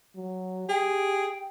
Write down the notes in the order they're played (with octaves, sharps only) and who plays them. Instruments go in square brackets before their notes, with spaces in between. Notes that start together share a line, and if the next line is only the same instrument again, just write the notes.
[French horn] F#3
[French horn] G4 [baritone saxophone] G#4 [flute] G5